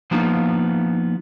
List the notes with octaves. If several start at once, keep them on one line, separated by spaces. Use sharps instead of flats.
F3 A#3 B3 D#4 F4